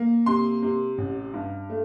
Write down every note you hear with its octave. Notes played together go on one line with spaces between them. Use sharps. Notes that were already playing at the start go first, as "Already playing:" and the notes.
Already playing: A#3
C3 C6
C3
A1
G2
A3